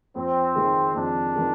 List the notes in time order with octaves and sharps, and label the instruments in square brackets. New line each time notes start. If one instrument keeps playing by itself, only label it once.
[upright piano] F2 [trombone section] C4
[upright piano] D#3 G#3 D#4 G#4
[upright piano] F2 [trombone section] D4
[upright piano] D#3 G#3 D#4 G#4